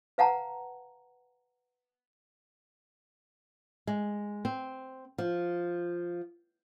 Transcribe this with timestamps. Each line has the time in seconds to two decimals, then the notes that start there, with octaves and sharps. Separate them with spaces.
0.18 B4 F5 F#5 A5 A#5
3.87 G#3
4.45 C4
5.18 F3